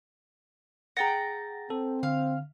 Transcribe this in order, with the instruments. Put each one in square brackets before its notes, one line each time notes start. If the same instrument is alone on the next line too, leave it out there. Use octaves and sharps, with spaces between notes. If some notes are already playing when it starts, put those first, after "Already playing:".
[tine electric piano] G#4 A6 A#6 [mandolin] F#5 G5 A#5
[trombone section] C4 [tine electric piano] A4
[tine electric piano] D3 [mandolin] F5